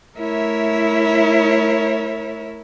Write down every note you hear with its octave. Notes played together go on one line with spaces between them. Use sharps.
A3 E4 A#4 C#5 E5